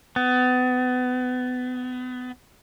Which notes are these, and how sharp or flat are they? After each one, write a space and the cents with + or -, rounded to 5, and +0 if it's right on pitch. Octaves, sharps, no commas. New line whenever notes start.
B3 +30